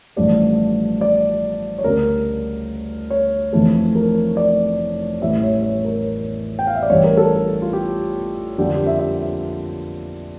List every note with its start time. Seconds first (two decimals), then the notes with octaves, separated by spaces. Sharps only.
0.16 A1 G2 F3 A3 D5
1.01 D5
1.78 C#5
1.84 D2 C#3 G3 A#4
3.10 C#5
3.53 F1 F2 E3 A3
3.95 A#4
4.37 D5
5.21 A1 A2 E3 G3 E5
5.43 C#5
5.63 C#5
5.85 A#4
6.59 G5
6.67 F5
6.75 E5
6.83 D5
6.90 A1 G2 E3 G3 C#5
7.04 A#4
7.17 A4
7.62 F4
7.73 G4
8.58 F2 D3 G3 A#3 G4
8.67 F4
8.72 G4
8.86 E5
8.99 E5